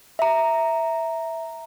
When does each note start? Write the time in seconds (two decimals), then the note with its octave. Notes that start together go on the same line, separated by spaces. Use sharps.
0.19 E5 A#5